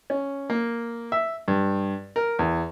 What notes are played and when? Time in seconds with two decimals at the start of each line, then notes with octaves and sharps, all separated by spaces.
0.10 C#4
0.50 A#3
1.12 E5
1.48 G2
2.16 A#4
2.39 E2